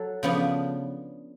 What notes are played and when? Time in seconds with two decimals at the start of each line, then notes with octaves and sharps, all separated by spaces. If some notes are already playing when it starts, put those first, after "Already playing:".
Already playing: F#3 A4
0.23 C#3 F3 B3 D4